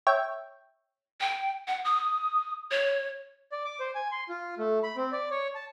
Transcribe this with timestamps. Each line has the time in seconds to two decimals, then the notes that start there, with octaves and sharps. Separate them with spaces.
0.07 C#5 E5 G5
1.21 G5
1.67 F#5
1.85 D#6
2.71 C#5
3.52 D5
3.65 D6
3.80 C5
3.95 G#5
4.12 C6
4.29 F4
4.58 A3
4.83 B5
4.97 C4
5.12 D5
5.31 C#5
5.55 A5